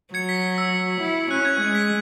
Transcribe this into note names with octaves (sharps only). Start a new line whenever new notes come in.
F#3 G#6 C#7
B6
E6
E4
C#4 F#6
G#6
G#3 G#6
B6